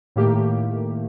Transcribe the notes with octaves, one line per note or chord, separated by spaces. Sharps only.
A2 D#3 A3 A#3 G4